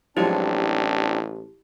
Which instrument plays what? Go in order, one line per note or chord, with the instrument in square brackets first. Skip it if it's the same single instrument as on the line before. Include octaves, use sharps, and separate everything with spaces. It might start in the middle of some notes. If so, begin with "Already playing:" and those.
[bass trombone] A1 [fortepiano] F3 F#3 G#3 [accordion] C4 D4 [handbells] E4 G4